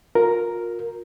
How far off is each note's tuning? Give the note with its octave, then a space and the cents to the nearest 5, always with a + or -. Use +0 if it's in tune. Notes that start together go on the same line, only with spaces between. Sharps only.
F4 +35 A#4 +0